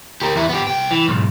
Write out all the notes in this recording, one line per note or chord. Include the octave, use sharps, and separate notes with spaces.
G4 A#4
E2 E4
B3 G4
C2 G5
E3
B1 G#2